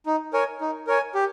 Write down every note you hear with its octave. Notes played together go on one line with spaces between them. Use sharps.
D#4
A#4 C#5 G#5
D#4
A#4 C#5 G#5
G4